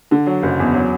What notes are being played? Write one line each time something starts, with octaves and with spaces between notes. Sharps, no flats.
D3
F#3
F#1
E2
F#3